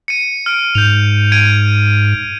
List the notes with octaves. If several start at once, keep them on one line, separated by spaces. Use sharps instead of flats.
C#7 D#7
F6 D7
G#2 G6 F7
G#6 D7 D#7